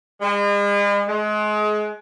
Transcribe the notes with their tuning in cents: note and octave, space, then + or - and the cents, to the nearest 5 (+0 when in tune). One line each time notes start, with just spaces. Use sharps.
G#3 -40
G#3 +30